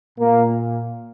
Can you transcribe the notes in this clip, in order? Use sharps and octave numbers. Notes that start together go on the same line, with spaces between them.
A#2 A#3